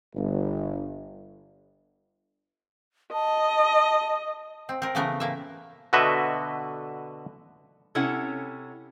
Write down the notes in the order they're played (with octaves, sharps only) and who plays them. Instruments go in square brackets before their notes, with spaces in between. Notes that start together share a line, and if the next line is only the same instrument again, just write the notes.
[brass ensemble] G1
[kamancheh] D#5 [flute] A5
[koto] C4
C4 A#4
C#3 E3 A3 B3 A#4
A2 A#3 E5
[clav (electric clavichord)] B2 D3 F#4 B4 D#5 E5
[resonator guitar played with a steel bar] C3 C#4 E4 A4 C#5 F#5